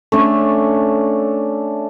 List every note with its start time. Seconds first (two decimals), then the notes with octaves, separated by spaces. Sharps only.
0.12 A3 C#4 D4